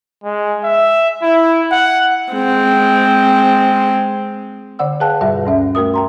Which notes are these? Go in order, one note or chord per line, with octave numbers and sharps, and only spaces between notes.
G#3
E5
E4
F#5
G#3 C4
D3 D5 F#5 E6
G#4 B4 F5 G5 A5 F#6
G2 B2 G3 F#4 B4 E5
D2 G2 C#4 E5
A3 F#4 A#4 D#6
G5 A#5 C6